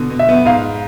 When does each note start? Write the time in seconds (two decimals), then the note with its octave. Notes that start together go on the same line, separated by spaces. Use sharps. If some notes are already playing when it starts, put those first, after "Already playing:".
Already playing: B2 D3
0.10 B2
0.19 E5
0.29 B3
0.45 G#2 F5